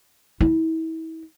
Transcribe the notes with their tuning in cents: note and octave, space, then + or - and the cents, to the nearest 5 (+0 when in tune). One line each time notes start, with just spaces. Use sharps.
E4 -35